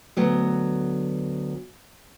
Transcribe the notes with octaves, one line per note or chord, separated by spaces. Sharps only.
D2 F#3 B3